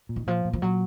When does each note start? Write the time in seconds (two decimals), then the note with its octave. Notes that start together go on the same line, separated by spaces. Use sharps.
0.09 A#2
0.16 D#3
0.27 A#2 F3
0.45 A#2
0.53 F3
0.62 A#2 F#3